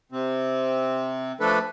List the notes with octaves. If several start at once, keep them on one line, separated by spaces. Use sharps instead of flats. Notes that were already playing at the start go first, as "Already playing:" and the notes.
C3 C4
F3 A3 D4 A4 B4